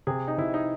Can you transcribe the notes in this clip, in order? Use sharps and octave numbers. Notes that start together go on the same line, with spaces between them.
C3 G#4
D#4
C3 E4
D#4